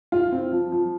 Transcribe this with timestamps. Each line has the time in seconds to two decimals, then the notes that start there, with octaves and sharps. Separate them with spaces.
0.12 F4
0.32 C4
0.52 F3
0.72 F3